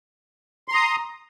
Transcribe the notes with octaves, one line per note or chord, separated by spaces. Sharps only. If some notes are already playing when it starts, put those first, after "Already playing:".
A#5 C6 D#6